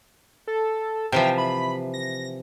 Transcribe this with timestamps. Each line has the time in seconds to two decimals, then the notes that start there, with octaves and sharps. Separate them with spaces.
0.47 A4
1.12 C3 E3 F3 G5
1.38 B5
1.94 A#6